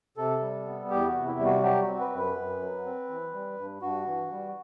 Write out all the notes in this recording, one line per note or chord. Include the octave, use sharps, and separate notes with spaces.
C3 A4
G3
B3
E2 G4
F#4
C3
E4
G3
F#4
F#3 G4
F#4
C4
B4
F#2
B4
F#2
F#3
C4
E3
G3
G2
G2 F#4
E3
G3